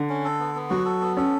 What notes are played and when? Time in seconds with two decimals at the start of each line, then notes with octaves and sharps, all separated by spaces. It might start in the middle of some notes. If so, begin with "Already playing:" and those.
Already playing: D3
0.09 C#4
0.24 A4
0.40 B3
0.55 B3
0.70 F#3 F#4
0.85 A4
1.01 B3
1.17 C#4 A4